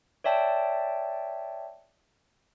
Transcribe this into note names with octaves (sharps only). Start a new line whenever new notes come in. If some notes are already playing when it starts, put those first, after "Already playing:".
C#5 D5 E5 G5 A5